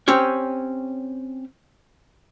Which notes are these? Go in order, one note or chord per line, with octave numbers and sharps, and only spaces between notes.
C4 C#4 G4 C#5